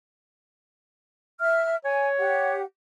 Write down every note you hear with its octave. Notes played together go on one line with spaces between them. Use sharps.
E5 F6
C#5 G#5
G4 F#5